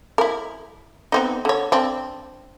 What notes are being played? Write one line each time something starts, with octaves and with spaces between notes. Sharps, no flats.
E4 A#4
B3 C4 D#4
D3 C#5
C4 D4